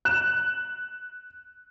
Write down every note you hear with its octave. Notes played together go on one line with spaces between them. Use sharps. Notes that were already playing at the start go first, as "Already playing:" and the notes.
F#6 E7